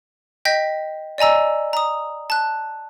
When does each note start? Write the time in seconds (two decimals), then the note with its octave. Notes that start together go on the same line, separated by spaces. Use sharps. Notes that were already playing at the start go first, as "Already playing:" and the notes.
0.45 D#5 G5 G6 A#6 B6
1.18 D5 D#5 G#5 A#5 E6
1.73 A#5 D#6
2.30 A5 F#6